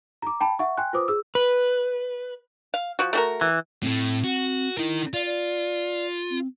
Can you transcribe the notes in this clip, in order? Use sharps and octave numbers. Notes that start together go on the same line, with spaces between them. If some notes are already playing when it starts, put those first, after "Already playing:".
A#5 D6
G5 A5 B5
E5 F#5 C#6
G5 G#5 C6 F#6
F4 B4 C5 D6 D#6
G#4 E6
B4
F5
F3 F#4
A3 F#4 A#4
E3
A2 A3 C4
F#4
D#4 E4 A#4
F4 D5
D5
C4